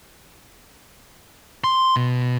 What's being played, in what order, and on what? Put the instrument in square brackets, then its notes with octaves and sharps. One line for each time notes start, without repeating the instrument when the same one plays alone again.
[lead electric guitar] C6
B2